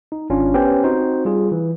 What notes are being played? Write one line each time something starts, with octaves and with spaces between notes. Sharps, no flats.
D#4
G#1 C#4 D4 F4
B3 C#4 G4 B4 C5 G5
C4 D#4 F#4 C5
G3 F4 G#4
E3